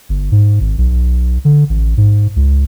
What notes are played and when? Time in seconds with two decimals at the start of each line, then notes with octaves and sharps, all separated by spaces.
0.09 G1
0.32 G#2
0.60 G#1
0.78 B1
1.45 D3
1.69 A1
1.97 G#2
2.36 C#2